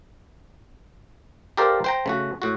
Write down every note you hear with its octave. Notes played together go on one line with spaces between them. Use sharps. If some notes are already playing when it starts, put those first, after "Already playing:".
G4 A4 A#4 C5 D5 F5
C5 G5 A#5
C#3 A3 F#4
A2 F#4